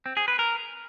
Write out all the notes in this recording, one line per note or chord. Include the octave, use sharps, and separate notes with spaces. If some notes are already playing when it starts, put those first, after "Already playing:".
C4
G#4
B4
A#4